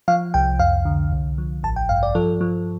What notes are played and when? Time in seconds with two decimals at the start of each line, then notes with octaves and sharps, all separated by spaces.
0.08 F3 F5
0.34 C2 G5
0.59 F2 F5
0.85 D3
1.12 C2
1.38 F3
1.63 A1 A5
1.76 G5
1.89 G2 F5
2.03 D5
2.15 F3 A4
2.41 F3